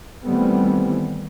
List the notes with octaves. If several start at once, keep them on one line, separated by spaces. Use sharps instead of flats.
D#3 E3 G3 A3 B3 C4